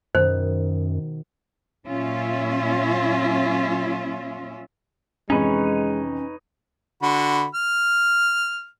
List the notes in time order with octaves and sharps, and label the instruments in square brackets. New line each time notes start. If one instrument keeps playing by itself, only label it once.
[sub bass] F#2 [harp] B2 D#3 [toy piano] C5
[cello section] A#2 F#3 C#4 F4 E5
[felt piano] F2 C3 E3 [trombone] G#3 [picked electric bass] C#4 [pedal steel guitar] D#4 B4 C#5
[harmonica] D3 F#4 B5
F6